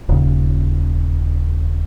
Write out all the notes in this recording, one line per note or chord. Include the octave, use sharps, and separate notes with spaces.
D#1 C#3